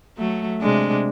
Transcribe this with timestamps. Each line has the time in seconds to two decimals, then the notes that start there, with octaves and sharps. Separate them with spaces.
0.17 F#3 A3
0.60 C3 G#3 D4